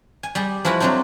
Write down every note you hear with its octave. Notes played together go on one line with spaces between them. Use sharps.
G#5
G3 G#4 D5
F3 G#3 E4 F#4 B4
F#3 A3 C4 D4 D#4